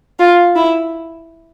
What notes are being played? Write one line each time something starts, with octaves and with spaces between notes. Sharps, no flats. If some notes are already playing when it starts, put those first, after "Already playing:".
F4
E4